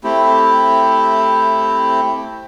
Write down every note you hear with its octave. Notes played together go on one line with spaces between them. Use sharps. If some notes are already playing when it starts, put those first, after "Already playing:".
A3 C4 E4 G4